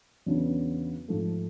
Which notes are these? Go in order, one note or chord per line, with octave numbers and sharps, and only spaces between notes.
E2 C#3 F#3 B3 D4
G#2 F3 A3